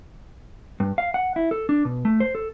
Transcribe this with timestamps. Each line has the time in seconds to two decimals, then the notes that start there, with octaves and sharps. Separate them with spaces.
0.80 G2
0.98 F5
1.14 F#5
1.36 E4
1.51 A4
1.69 D4
1.85 B2
2.05 A3
2.20 C5
2.35 A4